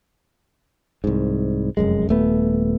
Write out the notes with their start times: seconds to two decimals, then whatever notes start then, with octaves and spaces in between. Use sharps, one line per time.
1.04 C2 G#2
1.77 F1 F#2 G#3
2.09 D#1 A3 B3